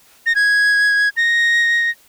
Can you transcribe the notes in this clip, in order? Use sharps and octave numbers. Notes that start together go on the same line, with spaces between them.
A#6
G#6
A#6